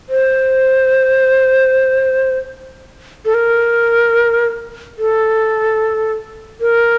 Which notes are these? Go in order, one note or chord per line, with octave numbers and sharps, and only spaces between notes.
C5
A4
A#4
A4
A#4